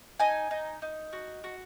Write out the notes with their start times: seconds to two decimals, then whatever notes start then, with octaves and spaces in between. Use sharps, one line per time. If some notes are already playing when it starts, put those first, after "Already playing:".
0.20 D#4 G#5
0.51 D#4
0.82 D#4
1.13 F#4
1.44 F#4